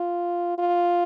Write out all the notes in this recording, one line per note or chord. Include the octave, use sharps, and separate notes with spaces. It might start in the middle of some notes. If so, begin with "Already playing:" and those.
Already playing: F4
F4